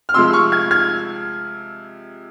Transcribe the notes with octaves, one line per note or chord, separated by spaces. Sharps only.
F6
C3 F3 G#3 C6 E6
C#6 F6
F6 G#6
F6 G#6